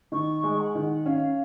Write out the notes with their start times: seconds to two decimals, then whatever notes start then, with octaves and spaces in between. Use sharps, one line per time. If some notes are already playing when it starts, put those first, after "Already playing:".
0.12 D#3 C#6
0.43 G#3
0.59 F#5
0.75 D#3
1.06 C#4 F5